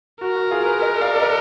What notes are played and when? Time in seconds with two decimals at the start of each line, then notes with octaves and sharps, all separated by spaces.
0.21 F#4 A#4
0.36 F#4
0.51 F4 G#4
0.66 G#4 B4
0.80 B4 D#5
1.01 D5 F5
1.16 D5
1.20 B4 D#5